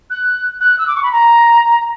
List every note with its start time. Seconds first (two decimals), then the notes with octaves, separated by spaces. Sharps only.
0.10 F#6
0.61 F#6
0.78 E6
0.88 D6
0.95 C#6
1.03 B5
1.12 A#5